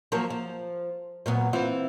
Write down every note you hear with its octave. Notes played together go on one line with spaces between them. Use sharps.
F3 F#3 A#3
F3
A#2 F#3 B3
E3 C4 F4